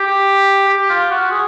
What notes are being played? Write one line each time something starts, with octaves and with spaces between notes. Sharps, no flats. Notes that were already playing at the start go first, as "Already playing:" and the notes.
Already playing: G4
G4
F4
F#4
G#4